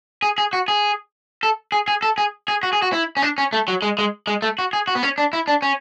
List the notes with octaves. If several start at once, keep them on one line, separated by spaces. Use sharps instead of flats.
G#4
G#4
F#4
G#4
A4
G#4
G#4
A4
G#4
G#4
F#4
G#4
F#4
E4
C#4
D4
C#4
A3
F#3
G#3
G#3
G#3
A3
F#4
G#4
F#4
B3
C#4
D4
E4
D4
C#4